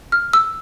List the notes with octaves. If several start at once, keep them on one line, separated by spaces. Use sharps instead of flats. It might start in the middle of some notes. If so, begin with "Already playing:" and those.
F6
E6